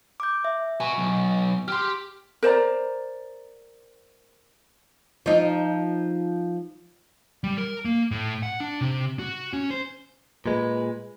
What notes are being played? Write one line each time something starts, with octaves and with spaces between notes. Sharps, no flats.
D6 G6
E5
F#4 B4 G#5 C#6
B1
G4 G5 C6 F6
A#4 C5 D5 A#5
F3 D#4
G3
A#4
A#3
A2
F#5
D4
C3
F#4
C#4
C5
A#2 G#3 B4